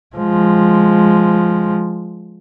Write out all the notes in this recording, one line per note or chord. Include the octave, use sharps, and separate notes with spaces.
F3 G#3